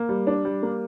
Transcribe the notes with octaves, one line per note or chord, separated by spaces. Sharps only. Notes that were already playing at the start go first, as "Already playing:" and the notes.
Already playing: A#3
G3
D4
G3
A#3